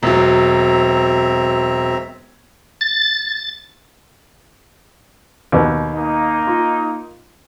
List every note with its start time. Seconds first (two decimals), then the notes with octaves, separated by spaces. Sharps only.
0.03 E1 F#3 C4 E5 A#5
2.81 A6
5.52 D#2 B2 B4
5.93 A#3 D#4
6.47 F4